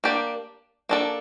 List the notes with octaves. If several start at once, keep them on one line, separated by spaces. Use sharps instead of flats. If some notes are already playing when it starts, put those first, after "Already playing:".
A#3 D4 G4 D5
A#3 D4 A4